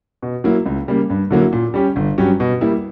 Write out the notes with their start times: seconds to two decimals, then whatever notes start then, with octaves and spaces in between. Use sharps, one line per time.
0.22 B2
0.44 F#3 A#3 E4
0.66 C#2
0.88 C#3 G3 A#3
1.10 G2
1.31 D3 F#3 A#3 E4
1.53 A#2
1.74 G3 C#4 G4
1.96 G1
2.18 G2 F#3 C#4 G4
2.40 B2
2.61 G3 A#3 E4